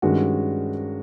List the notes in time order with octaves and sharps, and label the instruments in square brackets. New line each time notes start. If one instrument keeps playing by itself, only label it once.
[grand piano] G2 D#3 G#3 C#4 F#4